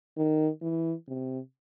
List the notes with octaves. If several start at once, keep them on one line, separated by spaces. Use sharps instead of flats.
D#3
E3
C3